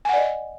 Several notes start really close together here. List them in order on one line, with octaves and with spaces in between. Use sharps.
G#5 F#5 D5 D#5